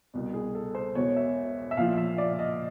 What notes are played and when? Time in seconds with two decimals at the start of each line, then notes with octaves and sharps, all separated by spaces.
0.14 C2 B2
0.34 G#4
0.55 A4
0.75 C5
0.95 E1 E2 B2 C#5
1.16 E5
1.71 E5
1.77 A#1 A#2 F3 F5
1.97 E5
2.18 D5
2.39 D#5